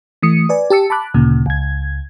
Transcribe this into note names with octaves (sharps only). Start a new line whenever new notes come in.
E3 A3 D#6 C#7
B4 D5 G#5
G4 A5 E6 C#7
A5 B5 D6 F#6
D2 A#2 C#3
C#2 G#6